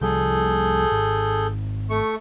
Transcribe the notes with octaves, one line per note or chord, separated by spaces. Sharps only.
C2 F3 G3 G#4 A4 G6
G#1
A3 C#6